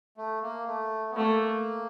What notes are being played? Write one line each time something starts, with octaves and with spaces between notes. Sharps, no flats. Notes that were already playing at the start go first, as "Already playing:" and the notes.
A3
A#3
A3
B3
A3 A#3